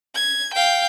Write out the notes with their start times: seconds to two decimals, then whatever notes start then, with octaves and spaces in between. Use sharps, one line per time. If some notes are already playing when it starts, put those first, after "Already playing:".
0.15 G#6
0.54 F5 G5